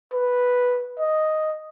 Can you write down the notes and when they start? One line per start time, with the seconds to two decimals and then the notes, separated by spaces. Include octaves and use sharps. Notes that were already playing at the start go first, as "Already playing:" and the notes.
0.13 B4
0.99 D#5